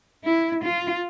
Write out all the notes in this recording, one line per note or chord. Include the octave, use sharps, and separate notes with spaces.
E4
F4